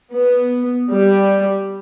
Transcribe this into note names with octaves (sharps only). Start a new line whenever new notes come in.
B3
G3